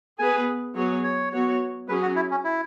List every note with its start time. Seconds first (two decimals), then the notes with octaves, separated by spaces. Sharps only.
0.19 B3 G#4 B4 G#5
0.75 F#3 B3 G#4 C#5
1.04 C#5
1.32 F#3 B3 F#4 C#5
1.88 F#3 C#4 G#4 B4
2.02 F#4
2.16 E4
2.31 C#4
2.44 E4